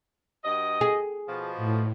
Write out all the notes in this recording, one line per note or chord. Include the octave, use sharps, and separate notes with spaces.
G2 F#4 D#5
G#4
B2 F3
A2